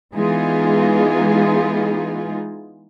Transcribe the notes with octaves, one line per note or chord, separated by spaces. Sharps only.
E3 G#3 B3 D#4 F4 G#4